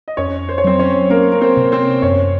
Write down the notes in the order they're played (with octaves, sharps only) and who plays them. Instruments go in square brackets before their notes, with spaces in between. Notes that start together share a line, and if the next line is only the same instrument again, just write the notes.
[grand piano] D#5
[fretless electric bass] F2 [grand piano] C#4 C#5
[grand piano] C5
C#5
[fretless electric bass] F#3 [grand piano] C4 C5
[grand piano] C#4 C#5
[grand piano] A#3 A#4 [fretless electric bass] C#4
[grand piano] A#4
C4 C5
[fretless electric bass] C3
[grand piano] C4 C5
[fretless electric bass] F#2 [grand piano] C#4 C#5